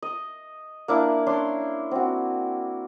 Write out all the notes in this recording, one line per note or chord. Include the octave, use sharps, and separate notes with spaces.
D#5
A#3 D4 E4
C#4 D4 C#5 C6
C4 F#4